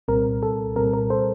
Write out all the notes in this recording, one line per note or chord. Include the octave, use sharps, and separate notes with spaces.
C2 A#2 G3 C4 A#4
A4
C2 A#2 G3 C4 A#4
A#4
A4 C5